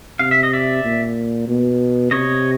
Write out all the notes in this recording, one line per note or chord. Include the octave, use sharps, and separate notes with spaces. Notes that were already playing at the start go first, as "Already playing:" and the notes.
C3 F5
E5
D#5
D5 E5
A#2
B2
C3 C#5 D#5